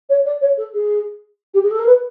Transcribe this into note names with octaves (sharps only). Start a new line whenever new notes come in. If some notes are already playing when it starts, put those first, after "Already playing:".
C#5
D5
C#5
A4
G#4
G4
G#4
A4
A#4
B4